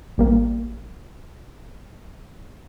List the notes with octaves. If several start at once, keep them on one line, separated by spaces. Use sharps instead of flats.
A1 G3 A#3